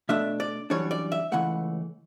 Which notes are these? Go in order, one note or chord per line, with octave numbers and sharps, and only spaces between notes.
B2 A3 D4 E5
D5
F#2 E3 G3 D4 C#5
D5
E5
C#2 C#3 E3 A3 F#5